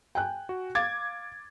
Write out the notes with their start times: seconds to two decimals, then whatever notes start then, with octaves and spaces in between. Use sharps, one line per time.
0.15 G5 G#5 F#6
0.49 F#4
0.75 F5 D6 G#6 A6